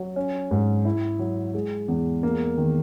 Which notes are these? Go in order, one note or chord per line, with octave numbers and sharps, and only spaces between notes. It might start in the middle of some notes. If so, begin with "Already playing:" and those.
Already playing: F#3
C#4
G#2
E4
F#3
G#3
E2
A#3
D#3